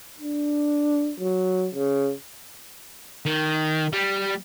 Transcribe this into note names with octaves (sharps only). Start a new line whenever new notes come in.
D4
F#3
C#3
D#3
G3